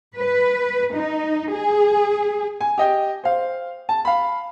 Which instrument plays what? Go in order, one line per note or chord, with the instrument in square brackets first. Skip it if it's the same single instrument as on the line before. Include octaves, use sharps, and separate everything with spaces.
[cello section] B4
D#4
G#4
[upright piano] G#5
G4 D#5 G5
C5 F5
A5
F5 B5